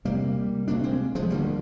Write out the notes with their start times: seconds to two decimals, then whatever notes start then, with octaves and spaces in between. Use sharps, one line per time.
0.05 D2 C3 G3 A#3
0.68 D2 C3 A#3 D4
0.83 G#3 C4
1.15 F3 G#3
1.30 D2 D3 G3 A#3